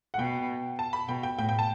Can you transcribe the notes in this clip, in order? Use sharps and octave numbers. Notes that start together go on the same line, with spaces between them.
F#5
B2 G5
A5
B5
B2 G5
G5
A2 G5
G5
A5